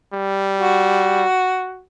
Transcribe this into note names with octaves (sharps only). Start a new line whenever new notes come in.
G3
F#4